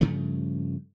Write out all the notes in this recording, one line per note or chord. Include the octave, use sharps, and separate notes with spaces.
G2 C#3 F3 A3